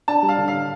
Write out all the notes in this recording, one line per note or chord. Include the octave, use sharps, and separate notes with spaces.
D4 A5
G3
F5
D3
F5